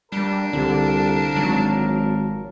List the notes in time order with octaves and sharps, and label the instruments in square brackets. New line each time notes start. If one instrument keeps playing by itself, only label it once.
[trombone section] A#2 A4 A#4 [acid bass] G3 [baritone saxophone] D4
[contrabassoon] C2 [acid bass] D3
[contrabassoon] G#1 [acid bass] F#3